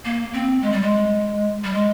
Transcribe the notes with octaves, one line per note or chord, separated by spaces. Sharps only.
A#3
C4
G#3
G3
G#3
G3
G#3